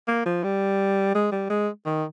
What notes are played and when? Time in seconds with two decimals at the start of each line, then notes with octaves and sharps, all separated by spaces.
0.08 A#3
0.26 F3
0.44 G3
1.15 G#3
1.32 G3
1.50 G#3
1.86 D#3